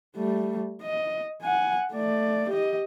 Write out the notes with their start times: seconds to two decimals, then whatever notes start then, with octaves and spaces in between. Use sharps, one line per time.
0.16 G3 A3
0.82 D#5
1.42 F#5 G#5
1.93 A3 D5
2.50 G4 D#5